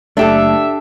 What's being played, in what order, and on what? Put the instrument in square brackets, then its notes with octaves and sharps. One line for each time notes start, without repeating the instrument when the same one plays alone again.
[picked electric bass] F#1 A3 [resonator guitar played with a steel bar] D4 G4 A4 [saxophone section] E5